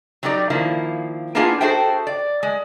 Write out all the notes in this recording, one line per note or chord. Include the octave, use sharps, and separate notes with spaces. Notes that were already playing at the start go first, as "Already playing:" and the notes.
F#3 G3 D#4 F#4 D5
D#3 F3 A#3 E4
A#3 B3 D4 E4 F4 G#4
F#4 G#4 A4 C5 E5 G5
D5
G#3